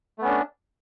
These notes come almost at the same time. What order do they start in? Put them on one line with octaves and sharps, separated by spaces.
A3 B3 C#4 D4